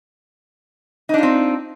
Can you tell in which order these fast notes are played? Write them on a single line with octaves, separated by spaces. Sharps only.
D#4 D4 F4 C4